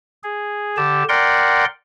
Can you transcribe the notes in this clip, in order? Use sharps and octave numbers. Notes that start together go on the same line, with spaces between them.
G#4
D3 G4 A5
A#4 D5 F#5 G5 C6